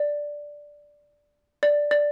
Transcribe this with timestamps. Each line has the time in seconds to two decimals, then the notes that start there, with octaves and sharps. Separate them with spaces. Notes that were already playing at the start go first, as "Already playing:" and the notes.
Already playing: D5
1.63 D5
1.91 D5